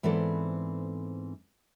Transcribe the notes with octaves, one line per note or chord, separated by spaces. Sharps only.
G#2 E3 B3 C4 A4 D5